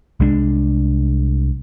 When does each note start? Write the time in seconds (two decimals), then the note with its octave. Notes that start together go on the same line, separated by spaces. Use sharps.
0.20 C2 G#3 C4 D4